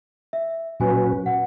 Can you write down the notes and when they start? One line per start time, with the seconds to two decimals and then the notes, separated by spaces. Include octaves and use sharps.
0.33 E5
0.80 A#2 F#3 C#4 F#4 B4 G#5
1.26 F#5